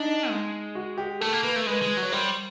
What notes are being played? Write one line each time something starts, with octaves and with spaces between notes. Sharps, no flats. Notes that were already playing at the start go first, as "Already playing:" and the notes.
Already playing: D4 D#4
G#3
F#4
G4
A3 A4
A#3
A#3 B4
A3
G#3 B4
G#3
F#3
C#5
G3 C5